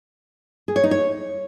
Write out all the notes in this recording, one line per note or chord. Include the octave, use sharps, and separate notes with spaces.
G#4
C#5
D#4
C#5